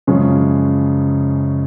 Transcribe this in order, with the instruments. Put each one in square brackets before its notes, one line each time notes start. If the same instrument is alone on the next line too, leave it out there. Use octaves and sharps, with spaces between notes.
[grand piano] F#2 C#3 F3 G#3 C#4